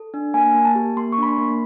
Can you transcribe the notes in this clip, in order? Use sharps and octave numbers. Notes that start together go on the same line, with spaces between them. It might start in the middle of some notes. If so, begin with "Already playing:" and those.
Already playing: A4
D4
A#3 G#5
A#3
A5
G4
A#3 C6
C#6
D4 B5
C6
A#3
B5